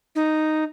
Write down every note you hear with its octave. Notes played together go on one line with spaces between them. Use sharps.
D#4